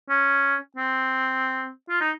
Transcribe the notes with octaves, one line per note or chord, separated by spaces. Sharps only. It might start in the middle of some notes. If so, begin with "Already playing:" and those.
C#4
C4
F4
D#4